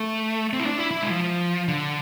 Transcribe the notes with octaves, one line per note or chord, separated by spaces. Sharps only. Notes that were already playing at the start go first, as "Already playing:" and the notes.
Already playing: A3
C4
E4
D4
E4
E4
G#3
F3
D3